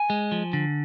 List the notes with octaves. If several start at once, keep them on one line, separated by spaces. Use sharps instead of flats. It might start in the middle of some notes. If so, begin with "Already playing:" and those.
Already playing: G#5
G#3
F3
D3